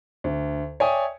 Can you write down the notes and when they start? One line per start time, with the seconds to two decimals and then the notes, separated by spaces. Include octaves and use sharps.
0.24 D2
0.80 C#5 D5 E5 G5 G#5 D#6